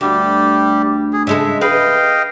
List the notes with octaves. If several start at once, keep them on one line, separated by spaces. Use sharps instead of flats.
D2 G3 G4
G#4
C#3 G#3 A4 E5
B4 D#5 F5 G5